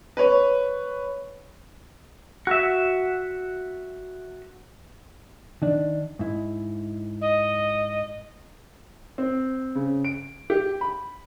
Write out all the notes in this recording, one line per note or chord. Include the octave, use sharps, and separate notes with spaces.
B4 C#5
F#4 E5
D#3 D4
G#2 E4
D#5
C4
C#3
D7
G4
B5